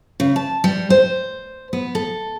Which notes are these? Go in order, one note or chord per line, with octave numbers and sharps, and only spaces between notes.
C#3
A5
G3
C5
B3
A4